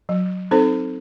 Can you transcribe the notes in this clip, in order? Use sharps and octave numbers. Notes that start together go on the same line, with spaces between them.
F#3
C4 D#4 A4 C5